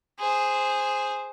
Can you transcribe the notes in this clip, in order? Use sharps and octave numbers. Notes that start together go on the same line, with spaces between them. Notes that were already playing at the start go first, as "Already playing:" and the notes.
G#4 C5